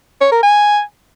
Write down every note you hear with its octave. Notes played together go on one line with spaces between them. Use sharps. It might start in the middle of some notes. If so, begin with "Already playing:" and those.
C#5
A#4
G#5